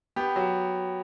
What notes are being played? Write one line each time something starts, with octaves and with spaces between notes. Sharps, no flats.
B3 G4
F#3